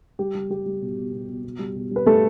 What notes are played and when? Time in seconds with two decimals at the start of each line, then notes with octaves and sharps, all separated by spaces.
0.19 G3 G4
0.35 G3
0.50 G3 G4
0.66 G3
0.81 B2
0.97 B2
1.13 B2
1.29 B2
1.44 B2
1.59 G3
1.75 B2
1.91 G3 B4
2.06 G3 A3 A4